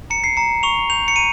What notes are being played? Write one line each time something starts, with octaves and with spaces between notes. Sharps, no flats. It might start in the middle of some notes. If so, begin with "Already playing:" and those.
A#5 C#7
C7
A#5 C#7
C#6 F7
G6 F7
C#7
A#5 D#7